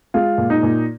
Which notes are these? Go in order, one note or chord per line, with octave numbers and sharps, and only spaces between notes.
G#3 F4
A#2
D#4
A#2